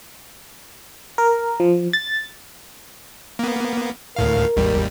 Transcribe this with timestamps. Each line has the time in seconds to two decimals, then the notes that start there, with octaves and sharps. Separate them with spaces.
1.18 A#4
1.60 F3
1.93 A6
3.39 A#3 B3
4.16 D2 A2 A#4 F5
4.57 G#1 D#2 G3